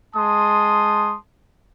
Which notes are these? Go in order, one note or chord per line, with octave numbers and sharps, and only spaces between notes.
G#3 A5 C6 D#6